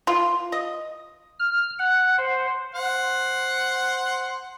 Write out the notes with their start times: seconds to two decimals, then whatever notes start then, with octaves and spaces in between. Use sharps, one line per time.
0.07 F4
0.52 D#5
1.39 F6
1.79 F#5
2.18 C5
2.75 C5 F#5